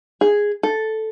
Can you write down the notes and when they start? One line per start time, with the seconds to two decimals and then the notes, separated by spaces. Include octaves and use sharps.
0.21 G#4
0.63 A4